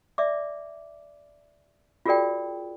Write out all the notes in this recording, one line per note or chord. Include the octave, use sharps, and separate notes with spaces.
D5 E5 D6
F4 F#4 G#4 A#4 D5 G5